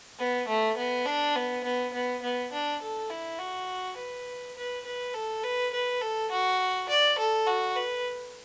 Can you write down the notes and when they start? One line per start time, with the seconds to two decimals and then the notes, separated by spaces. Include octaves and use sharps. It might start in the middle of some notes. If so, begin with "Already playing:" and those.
0.19 B3
0.48 A3
0.77 B3
1.06 D4
1.36 B3
1.64 B3
1.93 B3
2.22 B3
2.52 D4
2.81 A4
3.10 E4
3.39 F#4
3.97 B4
4.56 B4
4.85 B4
5.14 A4
5.43 B4
5.73 B4
6.01 A4
6.31 F#4
6.89 D5
7.19 A4
7.47 F#4
7.76 B4